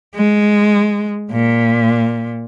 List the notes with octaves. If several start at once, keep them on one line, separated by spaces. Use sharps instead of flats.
G#3
A#2